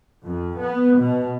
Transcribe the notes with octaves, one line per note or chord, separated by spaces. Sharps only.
F2
B3
B2